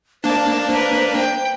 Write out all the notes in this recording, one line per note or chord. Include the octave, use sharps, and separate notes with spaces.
A#3 D4 C5 A5
A#4 B4
G5